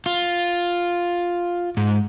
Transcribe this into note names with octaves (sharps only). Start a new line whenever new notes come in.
F4
G#2